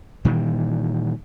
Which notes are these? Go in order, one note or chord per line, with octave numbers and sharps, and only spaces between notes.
A#2 D#3 E3 G3